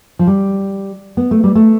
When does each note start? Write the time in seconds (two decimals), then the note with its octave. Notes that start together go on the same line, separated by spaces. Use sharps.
0.19 F3
0.27 G3
1.17 B3
1.31 A3
1.44 G3
1.55 A3